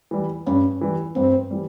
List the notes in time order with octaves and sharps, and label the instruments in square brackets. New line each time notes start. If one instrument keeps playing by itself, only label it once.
[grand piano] E3 G3
[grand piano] G2 [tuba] C#4
[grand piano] E3 G3
[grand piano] G2 [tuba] C4
[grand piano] E3 G3